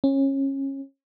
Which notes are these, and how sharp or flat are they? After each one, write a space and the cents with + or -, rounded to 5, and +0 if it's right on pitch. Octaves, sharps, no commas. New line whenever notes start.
C#4 -25